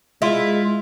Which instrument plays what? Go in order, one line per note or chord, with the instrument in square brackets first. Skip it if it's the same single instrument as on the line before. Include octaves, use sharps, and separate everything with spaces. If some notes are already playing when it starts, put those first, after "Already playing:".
[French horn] G#3 [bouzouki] E4 F4